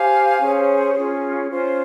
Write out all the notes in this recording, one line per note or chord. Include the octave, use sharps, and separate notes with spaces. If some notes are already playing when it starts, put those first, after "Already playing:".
Already playing: G4 C5 F5 G#5
C#4 G#4 C5
C#4 F4 G#4
C#4 F4 C5